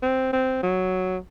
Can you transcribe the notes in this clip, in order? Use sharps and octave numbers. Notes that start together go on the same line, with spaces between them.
C4
C4
F#3